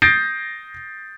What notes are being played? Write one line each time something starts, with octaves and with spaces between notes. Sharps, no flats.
D#6 G6 A6 A#6 C7 D7